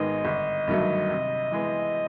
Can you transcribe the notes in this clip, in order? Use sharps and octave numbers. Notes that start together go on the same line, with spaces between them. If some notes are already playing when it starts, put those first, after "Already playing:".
Already playing: G#1 G#2 D#3 G#3 B3 D#5
G1
G2 D#3 F#3 A3
C3
E3 G#3 B3